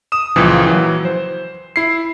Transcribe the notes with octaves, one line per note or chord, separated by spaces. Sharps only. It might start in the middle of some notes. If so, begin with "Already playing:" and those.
D#6 E7
C#2 A#2 E3 F3
E3 F#3
C5
E4 C7